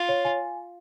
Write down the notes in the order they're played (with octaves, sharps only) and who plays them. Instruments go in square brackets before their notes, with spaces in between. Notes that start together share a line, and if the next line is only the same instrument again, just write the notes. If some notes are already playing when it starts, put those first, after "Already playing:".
Already playing: [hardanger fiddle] F4
[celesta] C#5
G#5